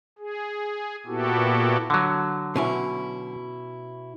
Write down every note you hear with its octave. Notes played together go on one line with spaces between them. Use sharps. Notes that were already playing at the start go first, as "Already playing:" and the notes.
G#4
A#2 B3 E4 F#4 G4 A4
D3 F#3
B2 C#4 E4